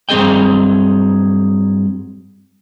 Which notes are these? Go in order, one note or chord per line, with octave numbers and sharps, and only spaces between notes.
G2 F#3 C4 G#4 D#5 G5